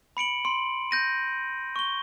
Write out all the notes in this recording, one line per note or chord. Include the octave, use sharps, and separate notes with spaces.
B5 C#7 D7 F#7
C6 D7
G6 A#6 D#7
C#6 G7